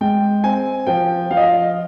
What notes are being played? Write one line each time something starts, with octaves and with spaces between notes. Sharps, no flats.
G#3 G5
C4 G#5
F3 G5
F3 F5
D#5
F5